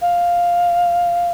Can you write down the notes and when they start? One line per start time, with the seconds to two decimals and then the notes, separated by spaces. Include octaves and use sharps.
0.01 F5